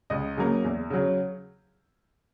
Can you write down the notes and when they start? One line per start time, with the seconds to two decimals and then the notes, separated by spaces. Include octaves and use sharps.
0.10 C#2 D#5
0.37 C#3 F#3 A#3
0.64 E2
0.90 C#3 F#3